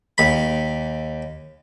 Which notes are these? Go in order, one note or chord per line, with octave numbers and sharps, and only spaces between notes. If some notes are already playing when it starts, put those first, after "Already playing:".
D#2 B5